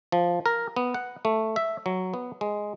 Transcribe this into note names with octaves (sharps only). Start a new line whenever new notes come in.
F3
A#4
B3
F#5
A3
E5
F#3
B3
G#3